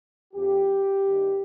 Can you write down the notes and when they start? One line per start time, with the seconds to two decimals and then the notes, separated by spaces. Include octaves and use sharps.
0.33 F2 D3 F3 G4
1.07 G2 D#3